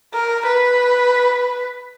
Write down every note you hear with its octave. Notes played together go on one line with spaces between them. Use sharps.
A#4
B4